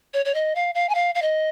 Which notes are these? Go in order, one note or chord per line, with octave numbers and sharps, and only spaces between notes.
C#5
C#5
D#5
F5
F5
G#5
F5
F5
D#5